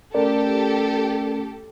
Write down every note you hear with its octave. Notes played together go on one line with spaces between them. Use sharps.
A3 C#4 G4 A4 A#4 D5